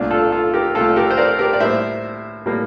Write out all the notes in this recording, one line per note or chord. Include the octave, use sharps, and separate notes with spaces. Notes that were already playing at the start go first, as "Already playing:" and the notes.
Already playing: C2 A#2 A3 D4 F4
F4 A4
F4 A4
G4 A#4
C2 A#2 A3 F4 A4
G4 A#4
C5
A#4 D5
G4 A#4
D5
A2 G3 A#3 C5 E5
A2 G3 A#3